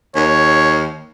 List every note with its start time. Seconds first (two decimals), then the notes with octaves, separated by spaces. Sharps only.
0.15 D#2 C#5